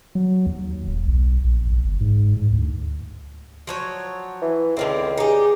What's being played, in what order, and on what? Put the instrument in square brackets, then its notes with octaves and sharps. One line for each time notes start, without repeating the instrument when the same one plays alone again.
[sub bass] F#3
D#2
D1
B1
A#1
A#1
G1
G#2
G#2
D2
[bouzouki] F3 F#3 C#5
[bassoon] E3
[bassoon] C#2 [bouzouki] D3 D#3 C4
[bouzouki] D#4 G4 [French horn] G#4